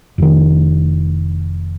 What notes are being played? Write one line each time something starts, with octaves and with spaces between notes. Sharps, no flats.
F1 D#3